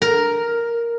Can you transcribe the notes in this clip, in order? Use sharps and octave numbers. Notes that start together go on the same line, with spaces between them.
A#4